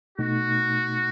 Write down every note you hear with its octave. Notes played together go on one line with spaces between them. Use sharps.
B2 A3 D#4 F#4